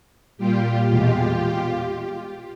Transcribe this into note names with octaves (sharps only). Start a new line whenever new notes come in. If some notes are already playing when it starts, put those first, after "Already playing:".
A#2 G3 F4 G4
E2 B2 G#3 F4 G4